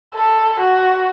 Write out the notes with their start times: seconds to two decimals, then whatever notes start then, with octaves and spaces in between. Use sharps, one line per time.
0.15 A4
0.60 F#4